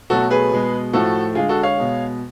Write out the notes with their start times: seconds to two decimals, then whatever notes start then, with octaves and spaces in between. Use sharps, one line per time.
0.10 B2 F#3 A3 F#4 A4
0.30 G#4 B4
0.51 B2 G#3
0.93 A2 F3 A3 F#4 A4
1.35 D3 G#3 F4 G#4
1.49 F#4 A4
1.63 C#5 F5
1.78 B2 G#3